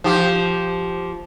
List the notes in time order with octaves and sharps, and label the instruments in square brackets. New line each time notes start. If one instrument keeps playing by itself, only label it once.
[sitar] F3 G4